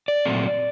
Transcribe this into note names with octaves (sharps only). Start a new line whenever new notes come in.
D5
A#2 F#3 A3 C4